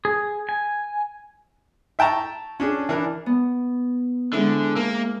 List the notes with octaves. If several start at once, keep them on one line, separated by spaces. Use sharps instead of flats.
G#4
G#5
E5 G5 A5 A#5 C#6
C#4 D4 G#4
E3 D4 A#4
B3
D3 G#3 C4 E4
A#3